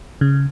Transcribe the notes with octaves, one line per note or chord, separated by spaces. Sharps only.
C#3